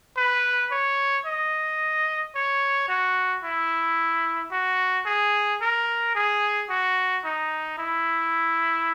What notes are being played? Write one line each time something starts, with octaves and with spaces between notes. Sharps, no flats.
B4
C#5
D#5
C#5
F#4
E4
F#4
G#4
A#4
G#4
F#4
D#4
E4